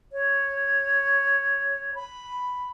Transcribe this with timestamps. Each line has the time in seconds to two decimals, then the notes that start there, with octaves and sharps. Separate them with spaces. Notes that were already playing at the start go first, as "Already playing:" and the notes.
0.13 C#5
1.95 B5